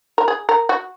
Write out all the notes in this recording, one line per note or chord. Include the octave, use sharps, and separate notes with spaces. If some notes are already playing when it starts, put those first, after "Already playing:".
A#4
G#4
A#4
F#4